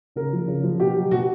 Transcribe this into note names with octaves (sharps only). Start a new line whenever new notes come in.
C#3 A#4
F3
C#3
F3
B2 G4
F#3
B2 F#4